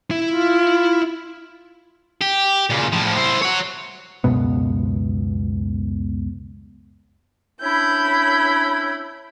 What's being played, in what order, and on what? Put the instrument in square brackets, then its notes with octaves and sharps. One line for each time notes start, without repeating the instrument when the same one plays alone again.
[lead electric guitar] E4
[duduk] F4
[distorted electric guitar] G4
A#2 C#3
A2 F3
E4 C5
C#5 F#5
[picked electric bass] C#2 F#2 B2 B3
[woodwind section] C#4 D4 E4 [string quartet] B5 G6